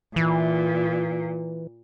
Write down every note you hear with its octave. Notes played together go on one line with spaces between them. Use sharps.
A#2 E3